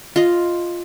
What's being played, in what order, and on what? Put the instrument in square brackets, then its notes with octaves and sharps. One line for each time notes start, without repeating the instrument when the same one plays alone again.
[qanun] F4 D#5